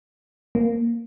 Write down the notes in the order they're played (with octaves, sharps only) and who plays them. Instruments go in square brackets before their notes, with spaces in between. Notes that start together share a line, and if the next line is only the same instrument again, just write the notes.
[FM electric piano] A#3